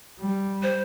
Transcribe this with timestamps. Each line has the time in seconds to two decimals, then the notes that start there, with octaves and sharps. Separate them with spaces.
0.20 G3
0.63 C5